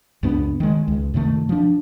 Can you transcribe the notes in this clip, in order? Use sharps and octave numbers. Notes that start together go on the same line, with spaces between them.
C#2 F#2 B3 D4
D#3 G#3
C#2
F#2 C3 D#3 A3
F3 D4